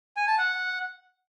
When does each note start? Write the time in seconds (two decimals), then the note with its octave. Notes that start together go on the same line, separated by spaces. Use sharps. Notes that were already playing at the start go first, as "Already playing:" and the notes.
0.17 G#5
0.27 A5
0.38 F#5